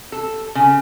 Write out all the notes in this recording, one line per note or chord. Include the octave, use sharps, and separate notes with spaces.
A4
C#3